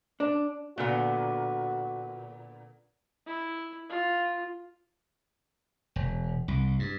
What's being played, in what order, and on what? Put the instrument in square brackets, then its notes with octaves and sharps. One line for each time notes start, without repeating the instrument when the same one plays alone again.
[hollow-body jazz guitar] D4
[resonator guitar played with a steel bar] A#2 D3 B3 [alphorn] F#4
[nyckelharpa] E4
F4
[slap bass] E1
C2
G2